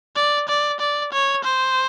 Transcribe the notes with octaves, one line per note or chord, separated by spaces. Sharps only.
D5
D5
D5
C#5
C5